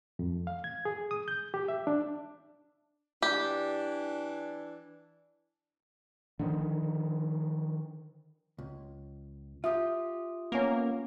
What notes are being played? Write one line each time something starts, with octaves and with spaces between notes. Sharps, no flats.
F2
F5
G#6
G#4
D#6
G6
G4
E5
D4
E3 D4 G4
D3 D#3 F3
C#2
F4 G4 E5 D#6
A#3 B3 C#4